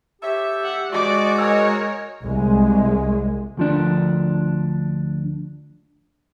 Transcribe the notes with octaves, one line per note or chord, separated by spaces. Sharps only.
G4 A4 C#5 E5
F#5
G#2 G#3 D#4 F#4 D5 C#6 D6
A#4 C#5 D#5 G#5 E6
C2 G#3
D2 F3 D4